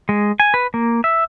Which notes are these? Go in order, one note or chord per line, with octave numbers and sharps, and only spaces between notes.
G#3
G#5
B4
A#3
E5